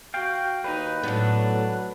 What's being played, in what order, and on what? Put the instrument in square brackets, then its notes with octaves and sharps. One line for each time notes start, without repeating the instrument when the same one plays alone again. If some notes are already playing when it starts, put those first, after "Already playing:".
[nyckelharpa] F#4 [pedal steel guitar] F5 G5
[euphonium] D#2 [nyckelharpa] D#4 [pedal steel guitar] B4
[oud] A2 B3 [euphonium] F#3 [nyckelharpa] D4